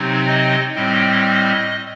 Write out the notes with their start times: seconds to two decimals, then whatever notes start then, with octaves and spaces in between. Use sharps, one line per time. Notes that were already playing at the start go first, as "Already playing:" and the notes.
Already playing: C3 F#3 C4 D#4
0.27 D#5
0.75 A2 G3 C4 D#5